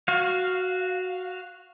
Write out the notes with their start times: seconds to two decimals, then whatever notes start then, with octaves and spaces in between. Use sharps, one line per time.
0.08 F#4 F5